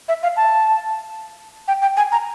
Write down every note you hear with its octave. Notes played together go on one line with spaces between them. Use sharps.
E5
F5
A5
G5
G5
G#5
A#5